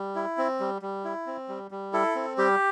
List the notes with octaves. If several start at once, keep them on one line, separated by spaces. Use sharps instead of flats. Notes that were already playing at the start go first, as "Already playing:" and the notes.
Already playing: G3
E4
C4
G3
G3
E4
C4
G3
G3
E4 A4
C4
G3 G4